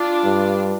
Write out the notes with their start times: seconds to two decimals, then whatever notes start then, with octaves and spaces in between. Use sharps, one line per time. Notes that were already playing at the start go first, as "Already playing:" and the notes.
Already playing: D4 F4
0.24 G2